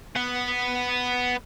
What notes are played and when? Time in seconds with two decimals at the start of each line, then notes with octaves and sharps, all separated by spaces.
0.16 B3 F#5